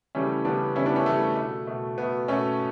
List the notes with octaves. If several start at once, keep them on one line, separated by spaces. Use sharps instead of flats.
C#3 E3 G3 A3 C#4
C#3 E3 G3 B3 D4
C#3 E3 G3 C#4 E4
B3 D4
A3 C#4
C#3 E3 G3 A3
B2 A3
B2 A3
B2 A3 B3
B2 A3 C#4